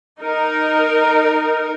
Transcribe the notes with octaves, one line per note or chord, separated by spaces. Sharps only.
D#4 A#4